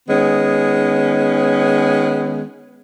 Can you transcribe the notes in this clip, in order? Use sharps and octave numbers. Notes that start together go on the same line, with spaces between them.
D#3 G#3 B3 C#4